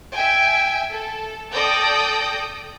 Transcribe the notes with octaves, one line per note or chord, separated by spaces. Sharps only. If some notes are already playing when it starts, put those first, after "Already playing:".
E5 G5 G#5
A4
A4 D5 G5 D#6 G6 A#6